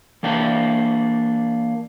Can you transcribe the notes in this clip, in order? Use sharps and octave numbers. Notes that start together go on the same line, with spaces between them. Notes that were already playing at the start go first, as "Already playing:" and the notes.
E3 A#3 D4 G5